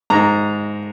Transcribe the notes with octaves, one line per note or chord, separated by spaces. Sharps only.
G#2 A#5